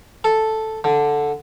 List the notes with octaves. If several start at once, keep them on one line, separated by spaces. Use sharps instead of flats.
A4
D3